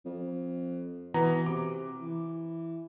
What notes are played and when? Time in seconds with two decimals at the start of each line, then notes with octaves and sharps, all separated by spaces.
0.05 F2
1.14 B2 E3 B3 A#5
1.46 C3 D6
2.01 E3